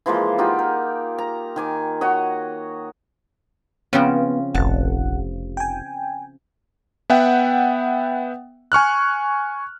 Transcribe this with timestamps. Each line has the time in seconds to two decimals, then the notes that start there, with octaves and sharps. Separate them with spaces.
0.06 E3 F3 G#3 A#3
0.38 D#4 F4 G4 F#5
0.59 A#4
1.18 A#5
1.56 D#3 G#5 D6
2.01 F#4 C#5 D#5
3.93 C#3 F3 B3 C4
4.55 F1 A#1 F#5 A5
5.57 G5 G#5
7.10 B3 E5 F#5 G5
8.72 G#5 C#6 F6 F#6